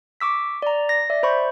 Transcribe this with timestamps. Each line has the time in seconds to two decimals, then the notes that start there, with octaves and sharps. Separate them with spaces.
0.21 C#6 D6 E6 B6
0.62 D5 A#5
0.89 A#6
1.10 D5 E5
1.23 C5 B5 C#6 G6